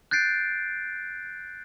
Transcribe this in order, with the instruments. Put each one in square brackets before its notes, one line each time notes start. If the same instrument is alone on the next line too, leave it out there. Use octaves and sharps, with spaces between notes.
[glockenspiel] F#6 G6 A6 C7 D7